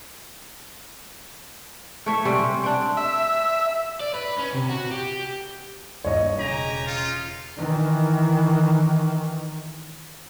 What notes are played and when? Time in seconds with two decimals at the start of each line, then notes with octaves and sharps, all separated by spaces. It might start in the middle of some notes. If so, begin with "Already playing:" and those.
2.06 A3 C#5 E5
2.25 C3 G3 C4 C#4
2.64 C4 D4
2.97 E5
4.01 D5
4.15 B4
4.38 C#4
4.54 C3
4.69 F#4
4.91 G4
6.04 D#1 G2 A#2 C#5 D#5
6.38 E1 C#3 G4 G#5 A#5
6.86 D#4 F4
7.56 D#3 E3